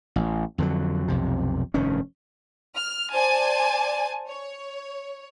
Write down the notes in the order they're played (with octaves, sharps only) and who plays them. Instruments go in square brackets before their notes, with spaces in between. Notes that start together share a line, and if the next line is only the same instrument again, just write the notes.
[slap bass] A1
F2 D3 D#3 F#3
B1 F2 C3
F1 G2 D#3 C#4
[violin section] F6
C5 D5 G#5 A5
C#5